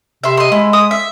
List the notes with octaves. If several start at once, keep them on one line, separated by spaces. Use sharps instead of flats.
C3 E5 C6
D#5 C6
G#3 E4
D#6
E5